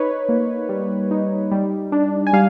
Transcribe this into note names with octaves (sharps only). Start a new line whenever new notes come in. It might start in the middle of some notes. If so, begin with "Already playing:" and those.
Already playing: D#4 B4 C#5
A#3
G3
D#4
G3
D4
G#5
G3 F5